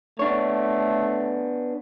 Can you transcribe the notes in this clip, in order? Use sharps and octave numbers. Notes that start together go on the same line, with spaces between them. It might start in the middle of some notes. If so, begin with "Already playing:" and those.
A3 B3 D4 C#5